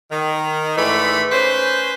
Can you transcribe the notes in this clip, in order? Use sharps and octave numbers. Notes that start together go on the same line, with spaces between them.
D#3
G#2 E3 A3 D5 B5
C#4 B4 C5